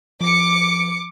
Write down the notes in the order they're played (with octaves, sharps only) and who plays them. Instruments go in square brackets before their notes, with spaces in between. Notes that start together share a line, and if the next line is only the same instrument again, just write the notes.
[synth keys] F3 [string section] D6 C#7